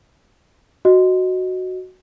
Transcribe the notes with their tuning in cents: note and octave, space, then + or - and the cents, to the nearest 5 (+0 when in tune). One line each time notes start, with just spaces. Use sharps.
F#4 +0 D#5 +0